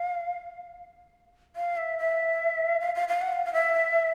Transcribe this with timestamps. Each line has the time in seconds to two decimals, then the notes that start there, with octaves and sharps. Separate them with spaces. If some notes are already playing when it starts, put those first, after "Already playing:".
Already playing: F5
1.56 F5
1.77 E5
1.98 E5
2.80 F5
2.95 F5
3.08 F5
3.21 F#5
3.33 F5
3.45 F5
3.53 E5